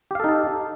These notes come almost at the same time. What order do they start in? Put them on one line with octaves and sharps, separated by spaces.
G4 F5 A4 D#4 A5